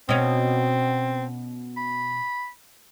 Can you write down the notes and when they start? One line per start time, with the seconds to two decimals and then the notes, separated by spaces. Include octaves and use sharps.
0.09 B2 C4 C#4
1.77 B5